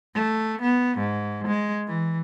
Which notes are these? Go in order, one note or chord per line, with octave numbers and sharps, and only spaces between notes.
A3
B3
G#2
G#3
E3